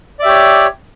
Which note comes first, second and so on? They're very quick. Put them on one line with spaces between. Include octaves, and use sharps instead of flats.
D5 E5 G4 C#5